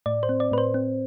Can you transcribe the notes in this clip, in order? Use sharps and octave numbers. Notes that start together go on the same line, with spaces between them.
A2 D5
C5
C4
D5
A2 B4
C5
C4